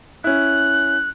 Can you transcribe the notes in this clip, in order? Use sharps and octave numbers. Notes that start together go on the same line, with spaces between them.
C#4 E4 F#6